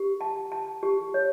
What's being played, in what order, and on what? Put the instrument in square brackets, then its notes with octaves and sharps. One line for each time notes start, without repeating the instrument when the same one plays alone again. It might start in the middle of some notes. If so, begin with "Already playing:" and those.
Already playing: [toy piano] G4
A5
A5
G4
C#5